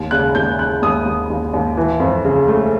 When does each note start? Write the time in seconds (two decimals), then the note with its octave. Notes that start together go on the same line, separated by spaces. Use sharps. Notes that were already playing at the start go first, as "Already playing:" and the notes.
Already playing: D#2
0.11 C#3 F#6
0.35 D#2 G6
0.59 C#3 F#6
0.82 D#2 D#6
1.05 D#2
1.30 D#2
1.53 D#2
1.77 E3
2.00 F2
2.25 C#3
2.48 A3